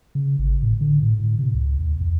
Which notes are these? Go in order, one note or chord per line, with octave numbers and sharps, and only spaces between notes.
C#3
G#1
A2
D3
A2
A2
C3
C#2
D#2
E2